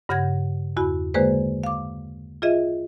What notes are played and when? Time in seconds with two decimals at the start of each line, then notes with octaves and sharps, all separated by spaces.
0.09 G2 C#3 F#5 G6 G#6 A#6
0.77 E2 E4 F#4 B5
1.14 D3 G#3 A#3 G#4 B4 C5
1.64 F5 D6
2.42 F4 G#4 D#5 E5